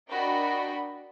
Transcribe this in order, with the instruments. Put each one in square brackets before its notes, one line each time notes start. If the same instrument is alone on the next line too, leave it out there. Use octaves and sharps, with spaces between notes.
[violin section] D4 F#4 A#4 D#5 G5 B5